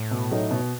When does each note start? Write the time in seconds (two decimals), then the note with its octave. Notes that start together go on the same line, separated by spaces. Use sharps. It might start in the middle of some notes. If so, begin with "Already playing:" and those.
Already playing: A2
0.11 B2
0.31 F#3 A3 D#4
0.51 B2